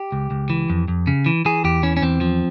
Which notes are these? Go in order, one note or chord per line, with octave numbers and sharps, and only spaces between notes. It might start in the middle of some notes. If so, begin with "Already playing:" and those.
Already playing: G4
C#2
C#2
E3
F2
F2
C#3
E3
E3 G#4
E2 G4
E3 C#4
C#4
E2 C4
F3